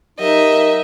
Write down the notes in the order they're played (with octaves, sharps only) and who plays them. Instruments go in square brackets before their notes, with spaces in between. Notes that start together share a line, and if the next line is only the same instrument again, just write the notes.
[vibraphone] F#3 G4 A#4 [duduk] D#4 [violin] D#5 E5